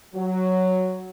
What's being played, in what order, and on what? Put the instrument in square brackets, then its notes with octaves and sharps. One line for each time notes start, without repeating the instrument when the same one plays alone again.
[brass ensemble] F#3